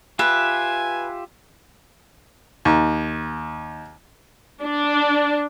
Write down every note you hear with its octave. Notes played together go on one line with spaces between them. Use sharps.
F4 G4 B4 E5 G#5
D#2
D4